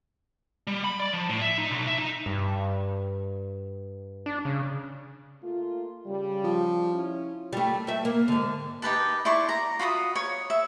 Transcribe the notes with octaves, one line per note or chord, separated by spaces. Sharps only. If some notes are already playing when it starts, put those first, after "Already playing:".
G3
B5
D5
F3
A2
E5
D#4
B1
E5
D#4
G2
D4
C#3
A3 A#3 F4
C#3 G3
F3
C#4 E4
G3 A3
A3 E5
A#3
G#2 D3
D#4 G4 B4 A5
E4 D5 C6 C#6
A#5
F4 F#4 B5 D#6
C#5
E5